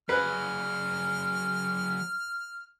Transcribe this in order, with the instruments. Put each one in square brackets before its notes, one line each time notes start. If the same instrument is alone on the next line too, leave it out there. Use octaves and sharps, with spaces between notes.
[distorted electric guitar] F#3 G#4 [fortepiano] B4 [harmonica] F6